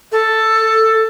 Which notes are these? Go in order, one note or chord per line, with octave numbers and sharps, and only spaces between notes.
A4